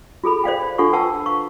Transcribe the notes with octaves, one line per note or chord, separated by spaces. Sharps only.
F4 G#4 A4 B5
C5 D5 F5 G5
D4 F4 A4 F#5 C#6
B4 F#5 G5 A5 C#6 E6
F5 C#6